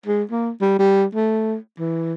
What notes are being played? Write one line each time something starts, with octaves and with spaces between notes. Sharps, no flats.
G#3
A#3
G3
G3
A3
E3